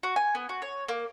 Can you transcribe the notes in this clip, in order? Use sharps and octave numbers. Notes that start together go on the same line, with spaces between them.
F#4
G#5
B3
F#4
C#5
A#3